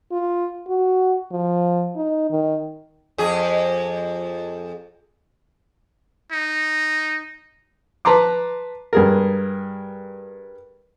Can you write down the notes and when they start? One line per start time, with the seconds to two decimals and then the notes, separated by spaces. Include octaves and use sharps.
0.11 F4
0.68 F#4
1.32 F3
1.96 D#4
2.31 D#3
3.18 F2 G#4
6.32 D#4
8.05 B4 A5 A#5 C6 D6
8.93 G2 G#4 A#4